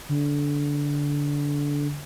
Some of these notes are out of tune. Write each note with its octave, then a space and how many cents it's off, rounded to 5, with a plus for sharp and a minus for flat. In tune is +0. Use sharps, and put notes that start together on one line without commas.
D3 -20